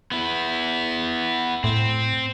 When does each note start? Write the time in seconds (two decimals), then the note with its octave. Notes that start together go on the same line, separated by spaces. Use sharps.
0.11 B3 E4
1.64 A2 C4